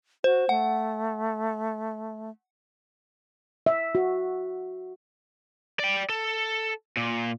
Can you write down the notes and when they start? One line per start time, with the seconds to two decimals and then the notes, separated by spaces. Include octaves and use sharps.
0.24 F#4 C5
0.49 A3 F#5
3.66 E5
3.95 F#4
5.79 D5 G5
6.09 A4
6.97 A#2